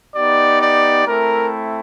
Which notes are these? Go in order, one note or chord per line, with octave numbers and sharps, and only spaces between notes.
B3 D#4 G4 D5
D5
A3 C4 E4 A#4